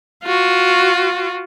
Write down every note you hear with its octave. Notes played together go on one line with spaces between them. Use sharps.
F4 F#4